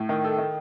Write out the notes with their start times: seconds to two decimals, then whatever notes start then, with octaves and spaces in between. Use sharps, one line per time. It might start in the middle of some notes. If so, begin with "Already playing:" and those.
Already playing: A2
0.09 D#3
0.24 A4
0.38 D#3